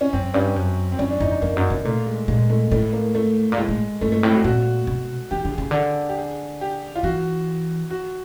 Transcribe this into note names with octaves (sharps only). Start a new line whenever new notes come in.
C#4
F#2 C4
G2 C#4
F#2
C4
F#2 C#4
D4
F2 D#4
D#4
F2 A#3
F#2
C3
A#2 A3
G#3
A#2 G#3
A3
A2 A3
A#3
A3
A#2
A2 G#3
A2
G2 A3
A3
A2 C4
F#4
A#2 F#4
B2
D#3 G4
D3 G4
G#4
C#3
D3 A4
G4
G#4
G4
F4
E3 F#4
F#4